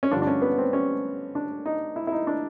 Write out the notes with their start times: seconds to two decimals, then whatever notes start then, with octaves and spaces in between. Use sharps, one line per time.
0.03 C#4
0.11 G2 D3 F3 D4
0.22 D4
0.27 C#4
0.42 B3
0.58 C4
0.73 C#4
1.35 D4
1.66 D#4
1.96 E4
2.07 E4
2.12 D#4
2.27 D4